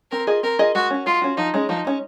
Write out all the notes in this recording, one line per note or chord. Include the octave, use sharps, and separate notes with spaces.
C4 A#4
F4 G#4 D#5
C4 A#4
F4 G#4 D#5
G#3 F#4
C#4 F#4
G#3 F4
C#4 F#4
F3 D#4
G#3 C#4
F3 D#4
G#3 C#4